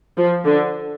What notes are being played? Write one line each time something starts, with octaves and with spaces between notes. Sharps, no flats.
F3
D3